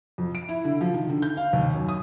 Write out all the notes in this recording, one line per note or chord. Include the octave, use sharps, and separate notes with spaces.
F2
D7
E4
D3
F3
D#3
D3
G6
F5
D#2
F#2
D#6